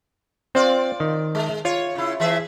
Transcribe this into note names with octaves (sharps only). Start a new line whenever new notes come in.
C4 F4 D5
D#3
G#3
F4 C#5
C#3 E4
E3 G#4 E5